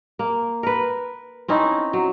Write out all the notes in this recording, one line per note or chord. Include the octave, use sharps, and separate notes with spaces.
A#3
A#4 B4
C4 C#4 D#4 E4
F#3